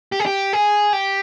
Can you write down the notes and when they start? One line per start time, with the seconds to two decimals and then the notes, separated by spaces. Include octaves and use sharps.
0.12 G4
0.20 G#4
0.26 G4
0.53 G#4
0.93 G4